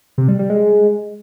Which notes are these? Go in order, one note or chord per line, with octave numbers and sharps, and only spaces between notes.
C3
G3
G3
G#3